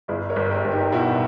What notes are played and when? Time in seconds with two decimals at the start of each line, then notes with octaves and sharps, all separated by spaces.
0.08 G1 E4 G#4
0.29 A#4 C#5
0.36 G1
0.50 G4 A#4
0.64 G1
0.71 D#4 G4
0.92 B2 E4